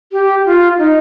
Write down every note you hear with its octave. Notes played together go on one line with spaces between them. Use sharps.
G4
F4
D#4